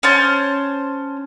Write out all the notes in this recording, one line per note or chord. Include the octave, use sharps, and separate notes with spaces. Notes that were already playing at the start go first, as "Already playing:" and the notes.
C#4 C5 A5